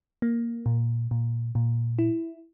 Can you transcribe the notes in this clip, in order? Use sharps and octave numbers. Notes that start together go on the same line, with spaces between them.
A#3
A#2
A#2
A#2
E4